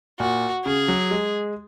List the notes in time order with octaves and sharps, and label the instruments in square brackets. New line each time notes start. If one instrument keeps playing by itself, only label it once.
[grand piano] A#2 [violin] F#4
[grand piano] C#3 [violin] G#4
[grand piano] F#3
G#3